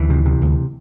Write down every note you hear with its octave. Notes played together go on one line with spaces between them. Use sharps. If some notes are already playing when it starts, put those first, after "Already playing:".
Already playing: D2 E3
C3
C3
D2